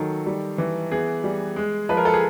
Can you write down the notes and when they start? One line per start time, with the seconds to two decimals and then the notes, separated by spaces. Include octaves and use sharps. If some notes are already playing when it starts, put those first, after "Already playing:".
Already playing: D#3 F#3 A4
0.26 G3
0.58 E3
0.92 B3 G#4
1.24 G3
1.56 G#3
1.89 F3 B4
1.97 A#4
2.05 A4
2.14 G#4